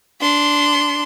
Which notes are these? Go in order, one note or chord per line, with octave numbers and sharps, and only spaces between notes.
D4 C6